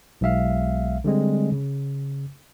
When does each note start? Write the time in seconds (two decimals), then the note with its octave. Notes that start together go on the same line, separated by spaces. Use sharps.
0.21 B1 G#3 E5 F5
1.04 D3 G3 G#3 C4
1.52 C#3